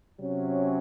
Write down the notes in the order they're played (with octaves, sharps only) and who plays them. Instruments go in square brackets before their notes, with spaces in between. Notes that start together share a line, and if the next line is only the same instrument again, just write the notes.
[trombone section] C3 F#3 C#4